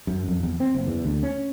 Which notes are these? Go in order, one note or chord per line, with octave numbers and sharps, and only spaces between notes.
F#2
F2
E2
C4
F#1
E2
D2
C#4